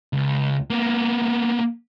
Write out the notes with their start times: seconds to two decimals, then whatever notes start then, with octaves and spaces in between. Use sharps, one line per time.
0.13 C#2
0.70 A#3 B3